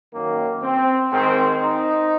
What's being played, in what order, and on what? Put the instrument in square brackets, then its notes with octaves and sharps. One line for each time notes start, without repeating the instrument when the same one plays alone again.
[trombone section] F#2 D#3 A#3
C4
G#2 D#3 C4
D#4